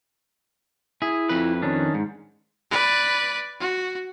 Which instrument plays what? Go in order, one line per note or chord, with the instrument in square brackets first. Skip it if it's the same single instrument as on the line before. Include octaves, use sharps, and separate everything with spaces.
[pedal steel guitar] E4 [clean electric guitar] G#4
[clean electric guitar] F2 B4
[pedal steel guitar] D#3 C#4 D4
[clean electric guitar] G#2
[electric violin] B4 D5
F#4